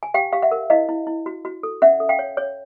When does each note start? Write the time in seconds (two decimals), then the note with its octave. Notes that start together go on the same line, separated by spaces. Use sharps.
0.03 G#5
0.14 G4 F5 G5
0.33 G4 F5
0.42 E5 F#5
0.51 A#4
0.70 E4 D#5 F5
0.89 E4
1.07 E4
1.26 F#4
1.45 F#4
1.63 A4
1.82 C#4 E5 F#5
2.00 A4
2.09 F5 G5
2.19 C#5
2.37 C#5